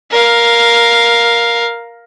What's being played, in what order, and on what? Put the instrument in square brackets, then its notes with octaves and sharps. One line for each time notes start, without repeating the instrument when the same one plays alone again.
[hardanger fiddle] A#4 F5